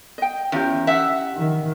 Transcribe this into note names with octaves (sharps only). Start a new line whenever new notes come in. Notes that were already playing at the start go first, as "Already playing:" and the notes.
D#5 G5
E2 C#4 F4 G4
E5 F#5
D#3